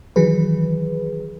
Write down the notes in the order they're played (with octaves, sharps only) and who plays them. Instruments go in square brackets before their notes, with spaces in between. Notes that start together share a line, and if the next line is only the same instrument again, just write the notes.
[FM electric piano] D#3 E3 F#3 G#4 B4